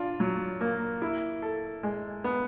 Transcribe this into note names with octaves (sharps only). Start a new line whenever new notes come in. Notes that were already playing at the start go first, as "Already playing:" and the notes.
Already playing: D4 F4
F#3
A#3
E4
A4
G#3
B3